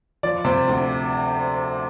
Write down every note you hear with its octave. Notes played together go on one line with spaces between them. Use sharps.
F3 D5
C3 C5
D2